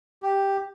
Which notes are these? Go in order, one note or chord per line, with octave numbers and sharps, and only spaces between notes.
G4